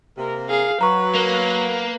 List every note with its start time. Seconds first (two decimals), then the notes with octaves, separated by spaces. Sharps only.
0.17 C3 A#3 A#4
0.49 G#4 F5
0.81 F#3 B4 A#5 C#6
1.16 A#3